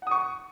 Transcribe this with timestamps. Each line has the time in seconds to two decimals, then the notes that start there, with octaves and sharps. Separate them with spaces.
0.02 F#5
0.07 D#6
0.11 C#6